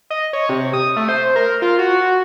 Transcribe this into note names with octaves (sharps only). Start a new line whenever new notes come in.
D#5
C#5
C3
D#6
A3
C5
A#4
F4
F#4